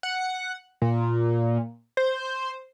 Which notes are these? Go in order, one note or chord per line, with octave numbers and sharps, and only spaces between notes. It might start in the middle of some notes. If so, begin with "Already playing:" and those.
F#5
A#2
C5